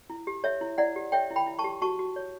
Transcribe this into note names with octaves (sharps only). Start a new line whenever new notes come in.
E4
G4
C#5 E5
E4
E4 D5 F#5
G4
C#5 E5 G5
E4
G5 B5
E4
A5 C#6
G4
F#4 A5 C#6
F#4
C#5